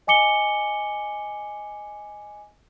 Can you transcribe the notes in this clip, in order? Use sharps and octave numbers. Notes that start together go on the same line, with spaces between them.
D#5 G#5 D6 C#7 G7